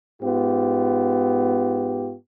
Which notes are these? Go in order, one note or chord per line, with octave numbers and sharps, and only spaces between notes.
G#2 B3 F4 G4